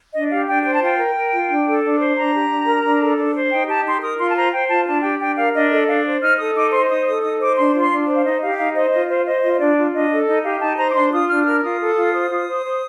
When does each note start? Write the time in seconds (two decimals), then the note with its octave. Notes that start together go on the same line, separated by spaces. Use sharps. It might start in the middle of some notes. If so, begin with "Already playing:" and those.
0.12 D4 D#5
0.30 G4 F5
0.47 D4 G5
0.64 C5 G5
0.74 A5
0.81 F4 G5
0.97 A#4
1.14 A#4
1.32 F4
1.48 D4
1.66 A4
1.82 D4
1.99 C5
2.16 D4 A#5
2.33 G4
2.50 D4
2.67 A#4
2.83 D4
3.01 A4
3.17 D4
3.35 C5
3.51 D#4 G5
3.68 G4 A5
3.85 D#4 C6
4.02 A#4 D#6
4.19 F4 C6
4.29 A5
4.36 C5 A#5
4.52 C5 G5
4.69 F4 A5
4.86 D4 A5
5.03 G4 G5
5.20 D4 G5
5.37 A#4 F5
5.54 D4 D#5
5.71 A4 D#5
5.88 D4 F5
6.04 C5
6.22 D#4 F6
6.38 A4 D#6
6.55 D#4 D6
6.72 C5 C6
6.89 D#4 D#6
7.06 A4 D#6
7.23 D#4 D#6
7.40 C5 D6
7.57 D4 C6
7.74 F4
7.80 C6
7.91 D4
8.08 C5
8.16 F5
8.24 D#4 D#5
8.41 G4 F5
8.58 D#4 F5
8.75 C5 D#5
8.92 F4 D#5
9.09 C5 F5
9.26 C5 D#5
9.43 F4 D#5
9.53 D#5
9.59 D4 D5
9.77 F4
9.93 D4 D#5
10.11 A4
10.27 D#4 D#5
10.44 G4 F5
10.61 D#4 A5
10.78 C5 A#5
10.91 D6
10.94 D4 C6
11.12 F4 D#6
11.29 D4 F6
11.46 A#4 F6
11.63 F4 D#6
11.80 A4
11.96 F4
12.13 C5
12.30 F4
12.47 C5
12.64 C5